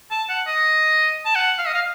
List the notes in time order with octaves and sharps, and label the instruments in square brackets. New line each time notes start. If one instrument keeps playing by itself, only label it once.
[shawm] A5
F#5
D#5
A5
F#5
F5
D#5
F5